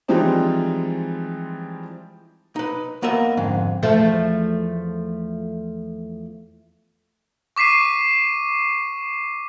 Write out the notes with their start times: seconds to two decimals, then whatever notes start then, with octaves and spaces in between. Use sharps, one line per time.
0.08 E3 F3 G3 G#3 C4 D#4
2.56 D#4 B4
3.02 A#3 B3 A#4 D#5 E5
3.37 F2 G#2 D3
3.83 E2 F3 A3
7.56 C#6 D6 B6 C7 D#7